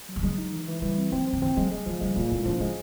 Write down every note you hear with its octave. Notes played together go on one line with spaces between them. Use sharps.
F#3
G3
F#3 G#3
D#4
E3
E3
E3 G3
C4
F#3 C4
C4
D#3
E3 C4
F#3 G#3
G3 G#3
F3 F#3
G3 G#3
A#2 A#3
A2 C4
F3 C#4
G#3 C#4